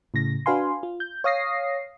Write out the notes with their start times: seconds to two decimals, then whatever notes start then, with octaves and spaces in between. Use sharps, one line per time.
0.14 A2 C#3 A#6
0.46 D4 F#4 B4 F5 G#5 C6
0.83 F4
1.00 G6
1.24 C#5 F5 D#6 A#6 C7